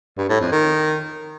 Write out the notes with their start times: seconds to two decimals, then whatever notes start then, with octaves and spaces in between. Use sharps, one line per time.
0.18 G2
0.29 A2
0.40 F2
0.52 D#3